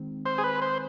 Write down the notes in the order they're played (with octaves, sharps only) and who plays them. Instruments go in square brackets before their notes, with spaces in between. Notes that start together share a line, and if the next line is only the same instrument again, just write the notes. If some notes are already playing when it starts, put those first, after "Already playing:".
Already playing: [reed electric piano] D#3 G#3 C4
[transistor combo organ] C5
G#4
B4
C5